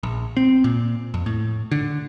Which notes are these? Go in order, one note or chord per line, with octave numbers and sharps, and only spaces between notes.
A#1
C4
A#2
F2
A2
D3